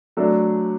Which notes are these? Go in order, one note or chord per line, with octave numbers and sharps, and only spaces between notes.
F#3 A3 D4 A4